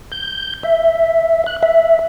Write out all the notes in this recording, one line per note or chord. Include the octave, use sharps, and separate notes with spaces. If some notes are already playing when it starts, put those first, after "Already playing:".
G6
E5
F#6
E5